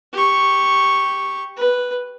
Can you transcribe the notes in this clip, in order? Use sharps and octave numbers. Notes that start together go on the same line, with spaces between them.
G4 C#6
B4